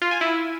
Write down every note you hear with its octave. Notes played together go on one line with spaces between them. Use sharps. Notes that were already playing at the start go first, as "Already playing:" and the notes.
F4
G#5
E4